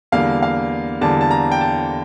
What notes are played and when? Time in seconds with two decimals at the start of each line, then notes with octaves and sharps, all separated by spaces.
0.12 E2 D3 G3 A#3 F5
0.42 F5
1.01 E2 D3 G3 A#3 A5
1.21 A5
1.31 A#5
1.52 G5
1.61 A5